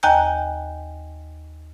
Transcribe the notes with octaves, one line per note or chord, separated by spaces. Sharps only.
D#2 D#5 G5 G#5 A#5 G6